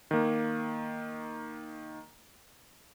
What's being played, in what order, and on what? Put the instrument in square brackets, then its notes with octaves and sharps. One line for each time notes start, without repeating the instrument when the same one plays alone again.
[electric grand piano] D#3 A#3